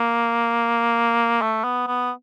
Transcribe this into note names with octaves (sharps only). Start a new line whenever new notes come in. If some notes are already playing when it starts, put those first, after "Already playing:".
Already playing: A#3
A3
B3
B3